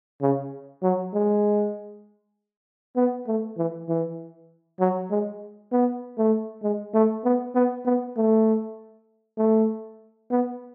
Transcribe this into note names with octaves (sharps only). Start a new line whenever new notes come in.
C#3
F#3
G#3
B3
A3
E3
E3
F#3
G#3
B3
A3
G#3
A3
B3
B3
B3
A3
A3
B3